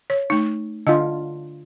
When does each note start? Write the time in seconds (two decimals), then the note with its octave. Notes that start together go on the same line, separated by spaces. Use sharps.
0.10 C#5
0.30 A3 D#4
0.87 D3 F4 D#5